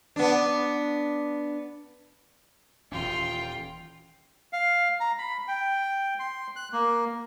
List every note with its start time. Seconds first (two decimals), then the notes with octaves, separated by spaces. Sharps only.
0.16 B3 D4
2.92 D#1 E3 C#4 F4 G5
4.53 F5
5.00 A#5
5.19 B5
5.48 G5
6.19 C6
6.56 F#6
6.73 A#3